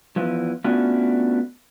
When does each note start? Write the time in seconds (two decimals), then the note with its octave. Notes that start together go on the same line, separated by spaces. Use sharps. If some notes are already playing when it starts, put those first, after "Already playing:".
0.16 E2 A#2 E3 F3
0.64 A3 B3 C#4 D4 F4 F#4